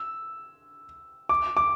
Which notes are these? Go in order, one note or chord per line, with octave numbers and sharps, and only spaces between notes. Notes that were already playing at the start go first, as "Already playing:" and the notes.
Already playing: E6
D6
D6